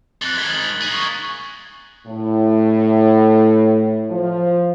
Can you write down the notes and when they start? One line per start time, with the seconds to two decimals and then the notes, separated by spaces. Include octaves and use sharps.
0.22 F2 F#6 A6
0.38 G#2 D#3 G#6 A6 B6
0.82 A#3 G#4
0.94 C#6 G#6
2.07 A2
4.11 F3